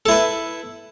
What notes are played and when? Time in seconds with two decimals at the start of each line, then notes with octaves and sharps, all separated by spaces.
0.06 A4
0.08 E4
0.11 B4